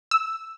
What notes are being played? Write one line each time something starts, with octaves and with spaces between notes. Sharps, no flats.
E6